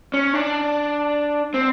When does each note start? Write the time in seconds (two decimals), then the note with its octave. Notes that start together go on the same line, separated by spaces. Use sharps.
0.14 C#4
0.34 D4
1.54 C4